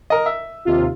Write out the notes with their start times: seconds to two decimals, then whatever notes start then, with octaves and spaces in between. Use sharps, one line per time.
0.10 A#4 D#5
0.26 E5
0.65 D#2 C3 F4